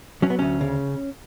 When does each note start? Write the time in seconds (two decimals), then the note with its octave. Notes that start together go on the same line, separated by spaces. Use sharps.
0.22 F#3 C#4
0.30 B3
0.39 D2 C#4
0.61 C#3